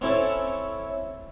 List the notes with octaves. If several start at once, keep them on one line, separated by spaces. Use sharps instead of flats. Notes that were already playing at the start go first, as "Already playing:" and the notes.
C4 C#4 E4 A4 C#5